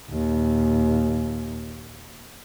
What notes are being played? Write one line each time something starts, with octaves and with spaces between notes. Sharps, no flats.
D#2 A#2